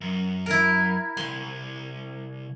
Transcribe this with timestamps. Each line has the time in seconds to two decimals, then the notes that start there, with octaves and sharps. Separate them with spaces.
0.01 F#2
0.46 E4 A#4
1.17 C2 C6